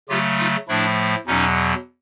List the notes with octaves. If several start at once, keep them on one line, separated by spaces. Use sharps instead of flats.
C#3 F#3 A3 F4 G4
D#4 F4
A2 F3 A3 D4 E4
E2 B2 F#3 C#4 D#4